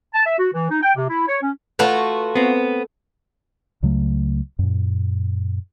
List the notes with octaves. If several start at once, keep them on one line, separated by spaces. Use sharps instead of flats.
A5
E5
F#4
E3
D#4
G5
C3
E4
C#5
C#4
A3 F4 F#4 B4
B3 C4
C#2 C#3 F#3 A3
F#2 A#2